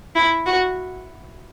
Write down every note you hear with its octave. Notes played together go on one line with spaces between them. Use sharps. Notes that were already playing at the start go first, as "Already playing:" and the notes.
E4
F#4